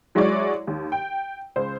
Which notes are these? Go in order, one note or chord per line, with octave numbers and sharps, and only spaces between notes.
F#3 G#3 E4 F#4 C#5 D5
D#2
G5
C#2 C5